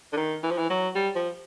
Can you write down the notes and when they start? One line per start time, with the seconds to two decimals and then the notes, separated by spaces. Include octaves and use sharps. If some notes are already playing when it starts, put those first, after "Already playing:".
0.13 D3
0.17 D#3
0.43 E3
0.51 F3
0.58 E3
0.70 F#3
0.95 G3
1.15 F3